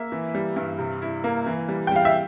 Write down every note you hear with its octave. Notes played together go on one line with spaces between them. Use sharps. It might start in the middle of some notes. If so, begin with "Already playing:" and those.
Already playing: A#3 E5
E3
G3
G2
C3
E4
A#3
E3
G3
G5
G3 F5
E5